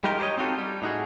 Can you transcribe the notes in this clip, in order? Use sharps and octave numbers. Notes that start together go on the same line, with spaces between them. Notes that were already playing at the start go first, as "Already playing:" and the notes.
G3 G#3 D#4 F4 G4 A#4
G4 A4 C5 C#5 D#5
C4 D#4 F4 F#4 A4
G3
A2 D#4 F#4 G#4